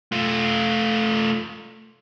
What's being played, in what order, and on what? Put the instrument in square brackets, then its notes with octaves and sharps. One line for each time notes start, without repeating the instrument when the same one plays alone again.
[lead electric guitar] A3 F4